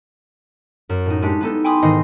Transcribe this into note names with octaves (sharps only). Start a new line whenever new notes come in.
F#2
A2 D#4
G#3 A3 D4 G4
B3 D#4 A4
G5 G#5 B5 C6 D6 D#6
E1 G#2 D#3 D#4 D#5 C7